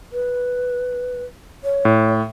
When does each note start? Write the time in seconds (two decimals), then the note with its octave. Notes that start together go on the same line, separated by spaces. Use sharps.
0.13 B4
1.64 C#5
1.85 A2